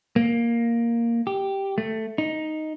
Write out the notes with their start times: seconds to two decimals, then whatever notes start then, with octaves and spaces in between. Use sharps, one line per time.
0.16 A#3
1.27 G4
1.78 A3
2.18 D#4